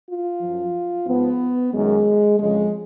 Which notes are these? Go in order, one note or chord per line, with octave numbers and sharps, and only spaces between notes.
F4
F#2 F3
G#2 F3 B3
F#2 D#3 G#3
F2 C#3 F3 G#3